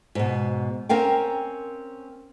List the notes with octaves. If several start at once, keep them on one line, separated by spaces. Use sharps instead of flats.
G#2 B2
C4 C#4 A#4 F5 G5